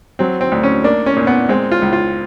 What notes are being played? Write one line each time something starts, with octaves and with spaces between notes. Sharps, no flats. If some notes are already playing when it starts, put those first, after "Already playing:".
F#3 C4
C4
D2
C#4
A#3 D4
C#4
A#2
B3
G#3 C4
F4
C#2
F4